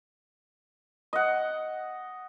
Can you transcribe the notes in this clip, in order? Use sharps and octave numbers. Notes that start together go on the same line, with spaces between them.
D#5 F#5